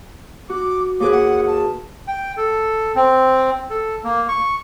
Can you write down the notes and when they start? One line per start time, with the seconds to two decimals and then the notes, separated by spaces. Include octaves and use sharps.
0.50 F#4 D6
1.00 D#2 G#4 B4 D6
1.12 F#5
1.47 A5
2.07 G5
2.37 A4
2.95 C4
3.70 A4
4.04 A#3
4.28 C#6